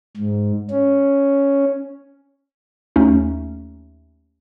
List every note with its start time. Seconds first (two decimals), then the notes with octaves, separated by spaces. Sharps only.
0.17 G#2
0.70 C#4
2.96 D#2 A3 C#4 D#4